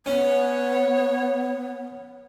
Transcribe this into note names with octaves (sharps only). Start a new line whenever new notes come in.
B3 C#4 C#5